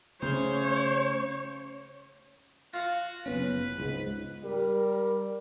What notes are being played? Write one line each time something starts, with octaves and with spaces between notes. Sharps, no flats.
C#3 A3 C#4 C5 C#5
F4 F#4 F5
F#1 B3 C#4 B4
C#2 G#2
G3 A#4